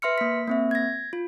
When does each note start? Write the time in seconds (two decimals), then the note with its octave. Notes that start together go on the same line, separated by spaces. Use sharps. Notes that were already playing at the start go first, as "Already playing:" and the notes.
0.02 B4 E5 C6 F6 C#7
0.18 A#3 B6
0.48 A#3 C4 E5
0.71 G#6 A#6
1.13 F4